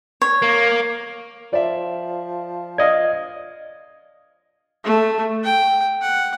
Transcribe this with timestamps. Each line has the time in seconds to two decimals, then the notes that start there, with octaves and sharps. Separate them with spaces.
0.22 C#5
0.42 A#3
1.53 F3 D5 E5
2.78 D5 D#5 F5 G#6
4.84 A3
5.44 G5
6.02 F#5